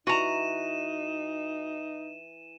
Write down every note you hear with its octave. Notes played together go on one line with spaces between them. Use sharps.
E3 D#4 F#4 A#5 D#7 E7